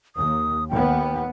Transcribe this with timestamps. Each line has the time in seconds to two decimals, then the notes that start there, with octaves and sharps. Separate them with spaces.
0.16 D#2 D#6
0.70 D#2 B3 G5